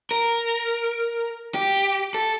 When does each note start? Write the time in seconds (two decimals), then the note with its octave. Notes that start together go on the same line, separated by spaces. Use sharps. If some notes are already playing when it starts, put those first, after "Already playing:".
0.11 A#4
1.54 G4
2.14 A4